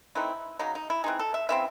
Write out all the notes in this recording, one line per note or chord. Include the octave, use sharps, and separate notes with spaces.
E3 A3 C4 D#4 E4
C#3 F#3 C#4 D#4
D#4
E4
E3 C4 D#4 G#4
A4
E5
C#3 E3 C4 E5